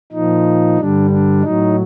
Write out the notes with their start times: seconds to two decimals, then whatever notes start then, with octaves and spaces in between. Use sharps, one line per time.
0.12 A#2 F3 D#4
0.78 G2 D3 G3 D4
1.10 D4
1.42 A2 F#3 D#4